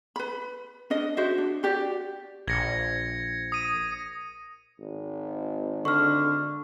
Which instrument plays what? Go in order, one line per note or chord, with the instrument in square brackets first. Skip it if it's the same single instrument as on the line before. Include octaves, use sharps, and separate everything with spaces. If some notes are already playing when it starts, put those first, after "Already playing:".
[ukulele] B4 B5
C#4 D4 D#5
F#4 C5 E5
D4
F#4 G4 D5
[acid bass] A#1 [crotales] G#6 A#6 C#7
[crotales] D#6 D#7
[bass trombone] G#1
[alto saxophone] D3 [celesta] C#6 F6